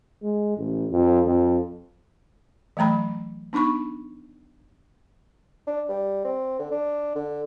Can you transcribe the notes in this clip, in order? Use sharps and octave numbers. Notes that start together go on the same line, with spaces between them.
G#3
A1
F2
F2
E3 F#3 A3 A#5 B5
B3 D4 D#4 B5 C#6
D4
G3
C4
D3
D4
D3